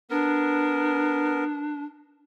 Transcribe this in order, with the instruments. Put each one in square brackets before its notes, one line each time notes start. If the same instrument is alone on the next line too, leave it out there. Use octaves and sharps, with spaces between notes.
[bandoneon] B3 A#4 [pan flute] D4